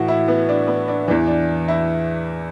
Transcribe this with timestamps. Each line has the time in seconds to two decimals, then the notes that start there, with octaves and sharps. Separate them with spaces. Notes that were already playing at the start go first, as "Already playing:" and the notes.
Already playing: A2 E3 F#4
0.08 E4
0.28 B3
0.49 D4
0.68 B3
0.88 D4
1.08 E3 D4
1.11 E2
1.27 D4
1.68 E4